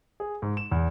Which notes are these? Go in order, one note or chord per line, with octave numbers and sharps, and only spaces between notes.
G#4
G#2
E7
E2